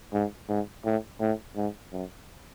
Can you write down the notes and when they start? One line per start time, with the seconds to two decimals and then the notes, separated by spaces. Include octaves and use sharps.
0.14 G#2
0.49 G#2
0.85 A2
1.21 A2
1.56 G#2
1.92 F#2